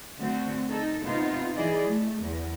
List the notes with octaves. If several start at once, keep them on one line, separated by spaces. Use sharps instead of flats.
D3 A3 C4 F#4
D#4 A4
C3 B3 D#4 F4
E3 E4 G#4 D5 D#5
A3
E2